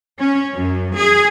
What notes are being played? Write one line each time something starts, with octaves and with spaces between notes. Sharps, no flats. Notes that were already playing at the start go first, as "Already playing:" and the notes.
C#4
F#2
G#4